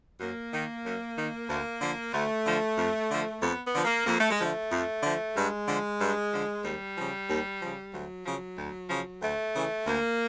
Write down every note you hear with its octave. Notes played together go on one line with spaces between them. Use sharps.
F#2 A#3
D#3
F#2
D#3
D2 A#3
D3 F3
D2 A3
D3 F3
F2
D3 F3
F2 B3
B3
D3 F3
A#3
F2 A#3
A3
G#3
D3 F3 A3
F2
D3 F3
G2 G#3
D3 F3
G2
D3 F3
D#2 G3
C#3 F3
D#2
C#3 F3
D2 F#3
C#3 F3
D2
C#3 F3
D2 A3
C#3 E3
D2 A#3